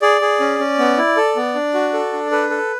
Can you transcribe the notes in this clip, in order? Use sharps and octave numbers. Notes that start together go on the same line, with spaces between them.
G#4 D5
G#4
C#4
C#4
B3
E4
A4
B3
D4
F#4
A4
D4
A4 B4
A4